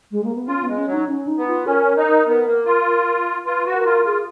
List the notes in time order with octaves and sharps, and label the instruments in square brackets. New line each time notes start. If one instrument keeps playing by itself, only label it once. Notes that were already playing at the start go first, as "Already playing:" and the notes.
[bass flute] G#3
A#3
B3
[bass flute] C#4 [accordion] F4
[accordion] G#3 [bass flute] B3
[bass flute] C#4
[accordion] F#3
[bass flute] D#4
C#4
D#4
[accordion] B3
[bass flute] F4
[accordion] C#4 [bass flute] A#4
[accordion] D#4
B3
A#3
F4
[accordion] F4 [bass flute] B4
[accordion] F#4
[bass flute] A#4
[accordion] F4
[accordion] F4 [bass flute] G#4